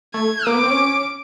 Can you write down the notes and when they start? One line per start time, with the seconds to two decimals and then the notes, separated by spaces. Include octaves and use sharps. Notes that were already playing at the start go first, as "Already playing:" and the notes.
0.14 A3 G#6
0.46 A#3 D6
0.54 B3
0.63 C4
0.71 C#4